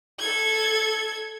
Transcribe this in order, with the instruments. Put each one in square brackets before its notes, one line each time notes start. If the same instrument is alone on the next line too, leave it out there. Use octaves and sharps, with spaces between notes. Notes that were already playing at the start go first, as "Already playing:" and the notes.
[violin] A4 G#6